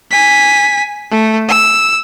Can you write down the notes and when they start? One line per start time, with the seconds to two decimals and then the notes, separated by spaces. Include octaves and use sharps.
0.11 G#5 B6
1.11 A3
1.48 E6